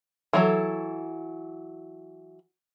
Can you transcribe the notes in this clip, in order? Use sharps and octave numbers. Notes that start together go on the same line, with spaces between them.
E3 F#3 A4